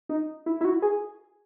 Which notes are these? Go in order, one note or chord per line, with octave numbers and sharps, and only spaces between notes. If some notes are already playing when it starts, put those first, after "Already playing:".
D#4
E4
E4
F#4
G#4